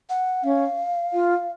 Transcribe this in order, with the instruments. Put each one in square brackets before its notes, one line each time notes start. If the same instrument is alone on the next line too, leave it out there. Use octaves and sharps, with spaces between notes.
[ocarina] F#5
[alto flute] C#4 [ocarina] F5
[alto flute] F4